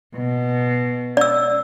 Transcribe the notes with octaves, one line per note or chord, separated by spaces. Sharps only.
B2
D5 E6